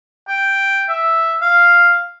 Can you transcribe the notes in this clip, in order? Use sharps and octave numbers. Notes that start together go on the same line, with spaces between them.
G5
E5
F5